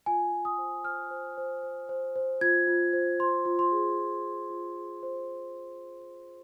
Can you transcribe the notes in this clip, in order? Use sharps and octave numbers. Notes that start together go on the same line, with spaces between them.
F4 G#5
F4
D#6
C5
C5 F6
C5
C5
C5
C5
C5
F4 G#6
F4
C5
C5 C6
F4
C6
G#4
F4
G#4
F4
G#4
C5